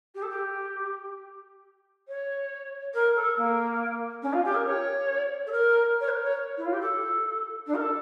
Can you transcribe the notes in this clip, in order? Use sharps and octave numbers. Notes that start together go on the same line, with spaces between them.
G4
A4
G4
C#5
A#4
A4
A#3
C#4
F4
G4
A#4
C#5
A4
A#4
C#5
A#4
C#5
E4
F4
G4
A4
D4
A#4
A4